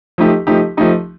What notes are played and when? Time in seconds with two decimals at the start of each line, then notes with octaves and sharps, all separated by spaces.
0.18 F3 A3 D#4 G4
0.47 F3 A3 D#4 G4
0.77 F3 A3 D#4 G4